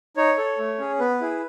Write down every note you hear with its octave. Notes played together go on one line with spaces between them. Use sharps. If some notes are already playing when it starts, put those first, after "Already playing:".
D#4 C#5
A4
A3
C#4 G#4
B3 B4
E4 G#4